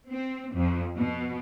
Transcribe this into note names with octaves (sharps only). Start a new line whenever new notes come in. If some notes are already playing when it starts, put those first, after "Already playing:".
C4
F2
B2